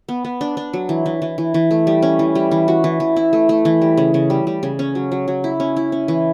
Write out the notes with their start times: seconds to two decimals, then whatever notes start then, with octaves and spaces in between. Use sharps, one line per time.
0.09 B3
0.25 B3
0.41 D4
0.57 D4
0.73 F#3
0.89 E3
1.06 E3
1.22 E3
1.38 E3
1.54 E3
1.71 A3
1.87 G3
2.02 C#4
2.19 E3
2.35 G3
2.51 E3
2.68 F#4
2.84 E3
3.00 E3
3.16 E4
3.33 A3
3.49 A3
3.65 E3
3.82 G3
3.97 C#3
4.14 C#3
4.30 G3
4.47 G3
4.63 C#3
4.79 C#4
4.95 F#3
5.12 F#3
5.28 F#3
5.44 E4
5.60 C#4
5.77 E4
5.92 C#4
6.08 E3